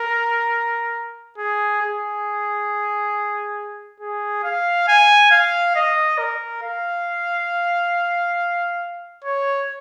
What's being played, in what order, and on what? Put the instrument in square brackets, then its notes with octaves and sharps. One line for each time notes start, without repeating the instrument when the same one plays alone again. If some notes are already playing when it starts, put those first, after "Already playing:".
Already playing: [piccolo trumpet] A#4
G#4
G#4
G#4
F5
G#5
F5
D#5
A#4
F5
C#5